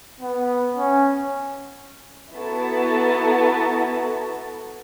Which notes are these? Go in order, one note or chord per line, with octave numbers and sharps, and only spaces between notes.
B3
C#4
B3 E4 F#4 A4 A5 A#5